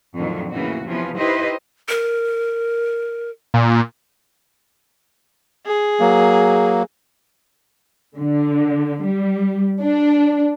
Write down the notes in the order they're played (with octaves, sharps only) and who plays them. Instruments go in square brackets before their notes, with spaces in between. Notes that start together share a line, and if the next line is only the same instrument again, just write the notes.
[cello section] F2 A2 D3 D#3 F#3
A2 C#3 E3 A#3 F#4
C3 E3 F3 B3 C#4
D#4 E4 G4 B4 C5 D#5
[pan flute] A#4
[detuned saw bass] A#2
[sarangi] G#4
[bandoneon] F#3 A#3
[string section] D3
G3
D4